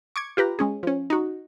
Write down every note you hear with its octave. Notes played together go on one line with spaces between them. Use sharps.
C#6 D6 G#6
F4 G4 B4 A#5
G#3 C#4 G#4
F3 C#4
D#4 F#4